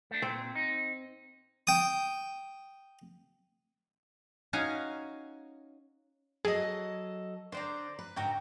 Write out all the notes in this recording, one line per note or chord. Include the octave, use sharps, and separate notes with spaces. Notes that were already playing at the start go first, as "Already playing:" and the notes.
A3 D4
A#2 C4
D#4
G5 D#6
C#4 D#4 F#4 F5 G#5 A#5
F#3 G#4 A4 D#5 A#5
D3 C5 D5 A#5
B4
G#2 D3 F#4 G5 A#5